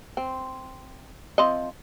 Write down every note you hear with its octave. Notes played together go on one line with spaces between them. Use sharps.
C4
F3 C4 D#5